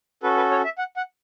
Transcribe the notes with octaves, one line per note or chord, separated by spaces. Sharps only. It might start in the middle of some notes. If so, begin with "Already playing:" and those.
C#4 F#4 A4 B4
B4
C#5
E5
F#5
F#5